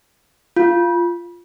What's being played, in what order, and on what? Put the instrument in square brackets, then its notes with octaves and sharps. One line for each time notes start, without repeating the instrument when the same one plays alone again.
[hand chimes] F4